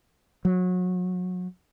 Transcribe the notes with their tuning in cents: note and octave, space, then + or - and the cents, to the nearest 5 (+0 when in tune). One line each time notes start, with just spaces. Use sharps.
F#3 -30